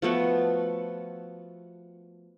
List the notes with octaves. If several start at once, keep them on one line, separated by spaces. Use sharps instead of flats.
F3 A3 B3 F#4